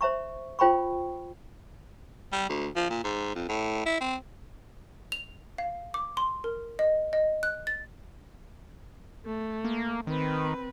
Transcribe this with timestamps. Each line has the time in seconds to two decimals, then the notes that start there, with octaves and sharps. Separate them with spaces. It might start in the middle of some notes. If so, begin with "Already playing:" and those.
0.01 C5 E5 A#5 C#6
0.59 F4 C5 G5 A#5 B5 C#6
2.33 G3
2.49 D2
2.76 F3
2.90 A#2
3.04 G#2
3.35 F2
3.49 A2
3.86 E4
4.01 C4
5.12 F7
5.58 F5
5.94 D6
6.17 C6
6.44 A#4
6.79 D#5
7.13 D#5
7.43 F#6
7.67 A6
9.25 A3
9.65 A#3
10.07 D#3 C4 B4